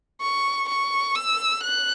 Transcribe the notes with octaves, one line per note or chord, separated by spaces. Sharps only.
C#6
C#6
E6
F#6